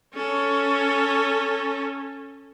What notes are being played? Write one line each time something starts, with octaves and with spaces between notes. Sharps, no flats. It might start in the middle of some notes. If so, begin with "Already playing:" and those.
C#4 A4